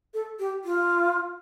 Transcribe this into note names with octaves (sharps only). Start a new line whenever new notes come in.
A4
G4
F4